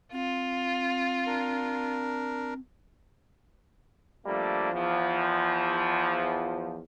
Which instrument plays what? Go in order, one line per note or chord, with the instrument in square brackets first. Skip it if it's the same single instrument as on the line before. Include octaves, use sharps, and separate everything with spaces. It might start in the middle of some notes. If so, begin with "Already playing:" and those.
[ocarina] C4 [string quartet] F4
[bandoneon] D4 A#4
[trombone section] F3 G3 A3 A#3 D4
E2 F3